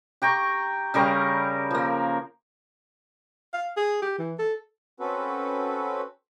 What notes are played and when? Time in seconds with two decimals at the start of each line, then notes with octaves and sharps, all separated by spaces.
0.22 G4 G5 A#5 C#6
0.94 C#3 G3 A#4 C#6
1.71 F3 A#3
3.54 F5
3.77 G#4
4.02 G4
4.19 E3
4.39 A4
5.00 C4 C#4 F#4 A4 B4